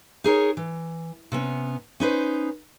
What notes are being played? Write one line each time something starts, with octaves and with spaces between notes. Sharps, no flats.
D#4 G#4 A#4 C#5
E3
C3 B3 C#4
C#4 D#4 B4 C5